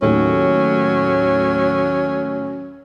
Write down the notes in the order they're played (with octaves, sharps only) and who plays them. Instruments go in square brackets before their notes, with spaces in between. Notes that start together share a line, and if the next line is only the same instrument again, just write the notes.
[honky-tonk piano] D#2 A2 D#3 [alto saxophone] F#3 [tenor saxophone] C#4